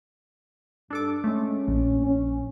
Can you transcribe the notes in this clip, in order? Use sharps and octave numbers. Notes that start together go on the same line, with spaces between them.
G2 D4 A4 D6
G#3 A3 C#4
A#1
C#4